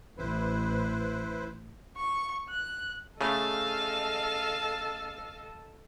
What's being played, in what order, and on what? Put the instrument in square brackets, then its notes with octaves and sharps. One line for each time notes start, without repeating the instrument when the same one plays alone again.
[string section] A1 [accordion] E4 B4 C5
[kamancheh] C#6
F#6
[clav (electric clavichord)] C#3 A3 [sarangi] A4 [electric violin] D#5 A5 [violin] F5